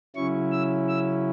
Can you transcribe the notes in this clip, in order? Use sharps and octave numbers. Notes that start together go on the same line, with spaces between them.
C#3 F#3 C#4 E4 C#6
E6
E6